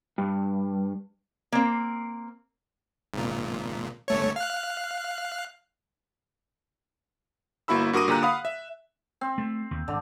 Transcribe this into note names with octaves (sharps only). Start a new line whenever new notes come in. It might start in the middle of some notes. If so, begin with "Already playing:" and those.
G2
A#3 C4
G#1 A#2
G1 A3 C#5
F5 F#6
G1 A#3 E4 F#4 B5 E6
G2 F#4 A#4 D6 D#6 D#7
A#2 D3 G4 A#5 F#6
F5 F#5 B5 D#6
E5
C4
A3
D#2
G#1 D3